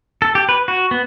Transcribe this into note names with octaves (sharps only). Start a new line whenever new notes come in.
A4
G4
B4
F#4
B3